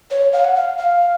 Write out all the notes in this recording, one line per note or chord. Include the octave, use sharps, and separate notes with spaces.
C#5
F5
F#5
F5
F5